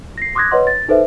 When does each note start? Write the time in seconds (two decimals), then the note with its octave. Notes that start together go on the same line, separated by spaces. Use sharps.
0.18 A#6 C7
0.35 C6 D6 D#6 F#6 G#6 A#6
0.51 B4 C#5 D#5 F#5 C6
0.67 A6
0.89 D#4 A4 B4 C5 E5